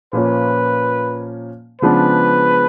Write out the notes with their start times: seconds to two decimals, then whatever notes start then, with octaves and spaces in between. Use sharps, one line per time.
0.13 A#2 F3 A#3 C#4 F4 B4
1.81 C#3 F3 G#3 B3 D4 B4